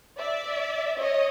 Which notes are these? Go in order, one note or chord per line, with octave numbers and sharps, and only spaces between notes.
D5 E5
C#5 D#5